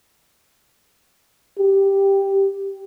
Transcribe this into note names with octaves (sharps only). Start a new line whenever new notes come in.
G4